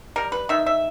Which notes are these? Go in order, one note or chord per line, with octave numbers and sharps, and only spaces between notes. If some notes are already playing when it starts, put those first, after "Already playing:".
G3 A#4
B4
D#3 E5
E5